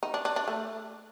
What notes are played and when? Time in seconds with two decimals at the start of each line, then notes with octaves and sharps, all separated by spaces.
0.03 D#4
0.14 D4
0.25 D4
0.36 D4
0.48 A3